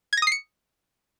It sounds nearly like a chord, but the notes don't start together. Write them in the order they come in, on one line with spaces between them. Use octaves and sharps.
G#6 A#6 D#6 C7 C#7